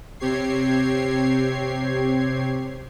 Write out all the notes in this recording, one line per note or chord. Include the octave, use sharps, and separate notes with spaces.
C3 C4 G4 C#5 G#6 C7